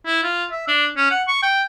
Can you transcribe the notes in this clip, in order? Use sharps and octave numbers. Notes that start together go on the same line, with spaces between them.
E4
F4
E5
D4
C#4
F#5
C#6
G5